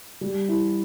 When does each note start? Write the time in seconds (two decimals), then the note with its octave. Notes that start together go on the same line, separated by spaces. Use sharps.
0.21 G3
0.49 E4